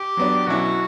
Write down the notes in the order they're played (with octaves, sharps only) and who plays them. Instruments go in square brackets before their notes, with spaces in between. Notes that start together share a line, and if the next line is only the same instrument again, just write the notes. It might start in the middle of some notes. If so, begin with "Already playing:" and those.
Already playing: [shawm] G4
[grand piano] F#3 B3 D4
[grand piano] B2 F#3 C#4 E4 [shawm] F#4